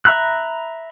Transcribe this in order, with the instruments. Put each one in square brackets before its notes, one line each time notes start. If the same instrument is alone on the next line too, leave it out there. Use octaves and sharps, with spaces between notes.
[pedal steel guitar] E5 A#5 B5 E6 F#6